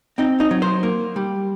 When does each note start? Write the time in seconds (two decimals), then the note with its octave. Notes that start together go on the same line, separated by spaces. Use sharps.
0.18 C4 D#4
0.40 D#4
0.51 F#3
0.62 C5
0.83 A#3
1.16 G3